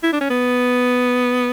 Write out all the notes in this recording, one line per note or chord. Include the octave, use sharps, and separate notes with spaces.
E4
D4
C#4
B3